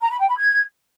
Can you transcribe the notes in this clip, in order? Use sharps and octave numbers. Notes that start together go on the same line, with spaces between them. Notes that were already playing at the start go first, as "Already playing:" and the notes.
A#5
B5
G5
B5
G#6